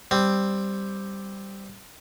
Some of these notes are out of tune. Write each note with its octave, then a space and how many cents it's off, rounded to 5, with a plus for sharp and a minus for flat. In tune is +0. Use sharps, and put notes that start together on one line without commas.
G3 +0 C4 +0